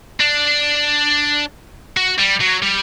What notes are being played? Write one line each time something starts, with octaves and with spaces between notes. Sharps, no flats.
D4
F#4
G3
F#3
G3